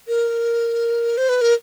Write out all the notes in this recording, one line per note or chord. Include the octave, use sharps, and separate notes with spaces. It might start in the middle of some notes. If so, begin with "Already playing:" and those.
A#4
C5
B4
A#4